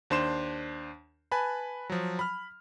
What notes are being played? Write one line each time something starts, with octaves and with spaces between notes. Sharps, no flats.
D#2 D4 C5 C6 E7
B4 G#5 A5 B5
F3 F#3
B5 F6